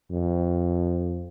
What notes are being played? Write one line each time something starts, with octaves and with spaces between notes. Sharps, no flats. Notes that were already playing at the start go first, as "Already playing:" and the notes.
F2